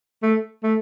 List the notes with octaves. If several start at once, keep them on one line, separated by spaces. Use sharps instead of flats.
A3
A3